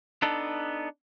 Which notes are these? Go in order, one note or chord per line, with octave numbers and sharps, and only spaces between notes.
B3 D4 D#4 A4